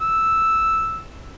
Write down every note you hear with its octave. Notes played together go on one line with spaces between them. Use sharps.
E6